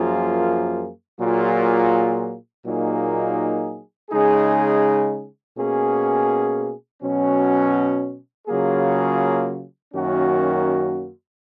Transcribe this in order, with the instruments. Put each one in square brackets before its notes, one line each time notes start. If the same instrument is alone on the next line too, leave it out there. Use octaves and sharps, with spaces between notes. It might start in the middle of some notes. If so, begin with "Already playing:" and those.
Already playing: [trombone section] F#2 F3 A#3 F4 G#4
A#2 F#3 A#3 F4 G#4
A#2 F#3 A#3 D#4 G#4
C#3 G#3 D#4 G#4
B2 A#3 C#4 G#4
B2 F#3 C#4
C#3 F#3 A#3 F4 G#4
F#2 D#3 A#3 C#4 F#4